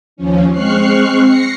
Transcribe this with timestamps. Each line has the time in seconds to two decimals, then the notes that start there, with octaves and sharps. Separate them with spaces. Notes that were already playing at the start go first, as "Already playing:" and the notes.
0.17 D#2 F3 C#4
0.51 G#3 C4 C#6 F6 F#6 C7
1.24 A#6 C7 C#7